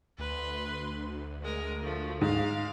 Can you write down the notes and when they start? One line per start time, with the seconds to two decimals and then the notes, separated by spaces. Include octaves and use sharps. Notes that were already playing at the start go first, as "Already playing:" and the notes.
0.19 D2 B4 C6
1.43 G#3 A#4
1.81 F3 A3
2.21 G#2 F5